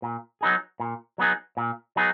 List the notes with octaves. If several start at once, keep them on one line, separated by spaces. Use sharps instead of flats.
A#2
F#3 B3 D#4 G#4
A#2
F#3 B3 D#4 G#4
A#2
F#3 B3 D#4 G#4